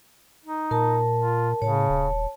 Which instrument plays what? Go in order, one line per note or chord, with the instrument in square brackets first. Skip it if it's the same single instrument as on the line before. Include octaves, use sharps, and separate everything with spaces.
[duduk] D#4
[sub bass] A#2 [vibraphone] A#4 A5
[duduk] F4
[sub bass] A2 [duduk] C#3 [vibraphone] C#5 A5
[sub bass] D#1